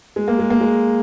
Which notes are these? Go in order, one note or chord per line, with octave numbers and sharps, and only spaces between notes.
G#3
A#3
G#3
A#3
G#3